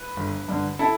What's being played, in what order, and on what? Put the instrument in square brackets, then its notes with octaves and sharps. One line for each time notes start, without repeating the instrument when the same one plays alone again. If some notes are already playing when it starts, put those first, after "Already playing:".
Already playing: [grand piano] B4
G1
G2 D3
E4 A4